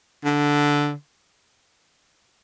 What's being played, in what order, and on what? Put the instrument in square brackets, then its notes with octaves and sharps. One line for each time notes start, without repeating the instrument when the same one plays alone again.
[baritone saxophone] D3